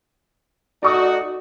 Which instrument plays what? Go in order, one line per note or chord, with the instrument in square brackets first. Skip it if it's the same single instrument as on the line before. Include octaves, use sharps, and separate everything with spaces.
[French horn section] A3 D#4 F#4 [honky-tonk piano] D5 C#6 D#6